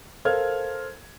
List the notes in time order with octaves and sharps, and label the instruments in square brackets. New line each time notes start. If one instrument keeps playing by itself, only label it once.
[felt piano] A4 A#4 C5 F5 F6 G#6